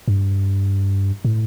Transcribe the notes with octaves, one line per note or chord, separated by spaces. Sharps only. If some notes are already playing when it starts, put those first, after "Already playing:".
G2
A2